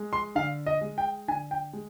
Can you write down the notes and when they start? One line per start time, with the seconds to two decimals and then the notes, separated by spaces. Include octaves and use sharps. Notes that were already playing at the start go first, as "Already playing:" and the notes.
Already playing: G#3
0.13 C6
0.35 D3 F5
0.66 D#5
0.81 G#3
0.98 G5
1.28 D3 G#5
1.51 G5
1.73 G#3